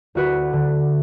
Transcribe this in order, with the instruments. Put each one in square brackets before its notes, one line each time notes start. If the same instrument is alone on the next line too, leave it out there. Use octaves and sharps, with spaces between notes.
[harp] D2 F#4 B4
D3